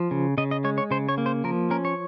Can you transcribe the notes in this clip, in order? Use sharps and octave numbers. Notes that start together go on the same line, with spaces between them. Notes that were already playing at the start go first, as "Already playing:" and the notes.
Already playing: F3
C#3
C#3 D#5
D#5
G#3 C#5
C#5
C#3 C5
C#5
A#3
C5
F3 A#4
C#4 A#4
C#5